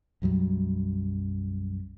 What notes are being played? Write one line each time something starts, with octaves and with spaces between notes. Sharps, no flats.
B1 F#2 F#3 G3